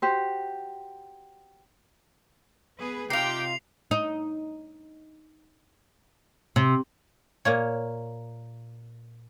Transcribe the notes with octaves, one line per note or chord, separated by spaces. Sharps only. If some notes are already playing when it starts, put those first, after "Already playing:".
F#4 G4 C5
B3 G#4 B4
C3 D#4 F4 G4 G5 C7 F7
D#4
C3
A#2 A#3 C#5